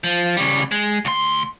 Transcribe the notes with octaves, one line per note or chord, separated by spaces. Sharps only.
F3
C#3 G3
G#3
D2 C6